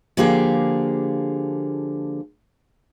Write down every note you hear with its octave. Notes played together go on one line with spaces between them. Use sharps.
D3 F3 A#3 G4 G#4